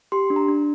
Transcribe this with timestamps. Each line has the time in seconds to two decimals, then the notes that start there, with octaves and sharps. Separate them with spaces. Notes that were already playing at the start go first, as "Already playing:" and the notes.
0.12 G4 C6
0.30 D4
0.36 A#5
0.48 D4